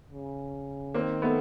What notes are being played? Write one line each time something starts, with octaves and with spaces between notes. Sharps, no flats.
C#3
D#3 A#3 C4
A3 B3